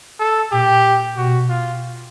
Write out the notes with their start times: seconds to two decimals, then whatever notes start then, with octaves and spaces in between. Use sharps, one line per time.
0.20 A4
0.52 A#2 G4
1.17 B2 F#4
1.50 F4